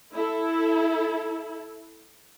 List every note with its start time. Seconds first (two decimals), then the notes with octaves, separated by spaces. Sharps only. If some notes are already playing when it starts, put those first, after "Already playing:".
0.15 E4 A4